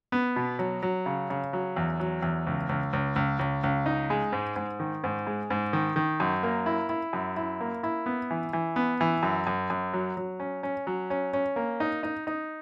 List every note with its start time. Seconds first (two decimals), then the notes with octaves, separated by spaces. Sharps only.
0.12 B3
0.36 B2
0.59 F#3
0.83 F#3
1.06 C#3
1.30 C#3
1.53 F#3
1.76 E2
2.00 F#3
2.22 E2
2.47 C#2
2.69 C#2
2.93 C#2
3.16 C#2
3.39 C#2
3.64 C#2
3.86 D#4
4.10 G#3
4.33 G#2
4.56 G#2
4.80 D#3
5.04 G#2
5.27 G#3
5.50 G#2
5.73 D#3
5.96 D#3
6.20 F#2
6.43 A#3
6.66 E4
6.89 E4
7.13 F#2
7.36 E4
7.61 A#3
7.83 E4
8.06 B3
8.31 E3
8.53 E3
8.76 B3
9.01 E3
9.23 F#2
9.47 F#2
9.70 F#2
9.94 F#3
10.17 F#3
10.40 C#4
10.63 C#4
10.87 F#3
11.10 C#4
11.33 C#4
11.56 A#3
11.80 D#4
12.03 D#4
12.27 D#4